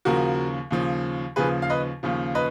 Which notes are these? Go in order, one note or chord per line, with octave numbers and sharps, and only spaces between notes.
D#2 C#3 F3 F#4 A#4
D#2 C#3 F3
D#2 C#3 F3 G#4 B4
F5
B4 D#5
D#2 C#3 F3
B4 D#5